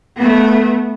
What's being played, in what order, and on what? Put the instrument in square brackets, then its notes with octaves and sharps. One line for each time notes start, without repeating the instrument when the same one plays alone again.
[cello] A3 B3